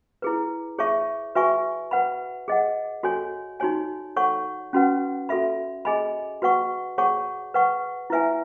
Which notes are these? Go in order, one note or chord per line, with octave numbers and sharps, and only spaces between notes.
E4 G#4 B4
G#4 C#5 E5 A5 C#6
F#4 B4 E5 G#5 C#6
B4 F#5 B5
G#4 D#5 F#5
F#4 A4 C#5 G#5
D#4 F#4 C#5 G#5
A4 C#5 F#5 C#6
C#4 F#4 B4 F#5
F#4 A4 E5 B5
G#4 D#5 G#5 B5
F#4 B4 F#5 C#6
G#4 C#5 F#5 A5 C#6
B4 F#5 C#6
E4 B4 E5 G#5